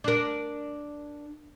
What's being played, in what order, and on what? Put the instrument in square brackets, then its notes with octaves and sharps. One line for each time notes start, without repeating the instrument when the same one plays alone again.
[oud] D4 A#4